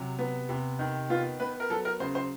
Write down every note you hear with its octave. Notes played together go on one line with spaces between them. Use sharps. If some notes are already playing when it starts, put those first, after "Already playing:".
Already playing: C3 F#3
B3
C3
D#3
B3 F4
B3 B4
A#4
F#3 A4
A#4
C#3 C5
C5